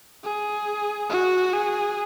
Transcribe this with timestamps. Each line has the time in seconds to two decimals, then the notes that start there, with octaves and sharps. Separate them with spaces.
0.24 G#4
1.10 F#4
1.53 G#4